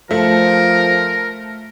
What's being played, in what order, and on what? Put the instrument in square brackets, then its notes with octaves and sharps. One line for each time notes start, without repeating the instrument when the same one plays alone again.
[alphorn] F3 [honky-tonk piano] A3 [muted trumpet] A#4